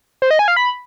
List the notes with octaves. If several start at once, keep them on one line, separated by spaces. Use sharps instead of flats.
C5
D#5
G#5
F5
B5